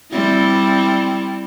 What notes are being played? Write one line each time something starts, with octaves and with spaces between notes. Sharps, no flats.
G3 C4 E4